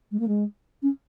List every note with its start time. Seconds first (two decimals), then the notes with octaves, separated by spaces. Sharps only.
0.11 G#3
0.19 A#3
0.27 G#3
0.82 C#4